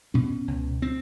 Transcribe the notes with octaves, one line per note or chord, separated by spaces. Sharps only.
B2 C#4
C#2
C4